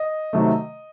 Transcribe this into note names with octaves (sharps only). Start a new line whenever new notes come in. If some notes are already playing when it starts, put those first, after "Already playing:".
Already playing: D#5
C3 D#3 F#3 A3